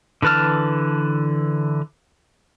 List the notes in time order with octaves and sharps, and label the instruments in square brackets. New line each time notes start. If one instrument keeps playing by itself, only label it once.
[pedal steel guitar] D3 E3 B4 A5 F6